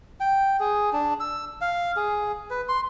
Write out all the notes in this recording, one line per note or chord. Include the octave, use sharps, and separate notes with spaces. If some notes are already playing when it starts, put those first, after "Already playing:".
G5
G#4
D4
E6
F5
G#4
B4
C6